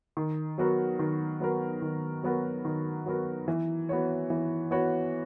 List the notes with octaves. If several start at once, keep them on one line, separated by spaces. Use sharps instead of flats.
D#3
F#3 B3 F#4 A#4
D#3
F#3 B3 F#4 A#4
D#3
F#3 B3 F#4 A#4
D#3
F#3 B3 F#4 A#4
E3
B3 F#4 C#5
E3
B3 F#4 C#5